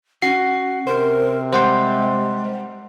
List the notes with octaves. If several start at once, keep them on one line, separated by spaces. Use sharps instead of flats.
C#4 F#4 C7
C3 A#4 C5
G3 G#3 C5 F#5 C6